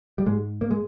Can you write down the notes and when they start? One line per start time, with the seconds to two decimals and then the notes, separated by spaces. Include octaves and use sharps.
0.18 G3
0.26 G#2 G#3
0.61 A#3
0.71 G#3